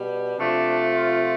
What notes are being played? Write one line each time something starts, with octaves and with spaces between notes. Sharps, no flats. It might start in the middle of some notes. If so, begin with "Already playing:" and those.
Already playing: B2 G3
C3 F3 A3 D4
F4